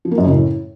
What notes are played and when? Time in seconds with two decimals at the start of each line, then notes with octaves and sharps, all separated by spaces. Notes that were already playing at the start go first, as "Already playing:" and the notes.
0.05 F3
0.11 A#3
0.18 F#2
0.24 C#3
0.31 A2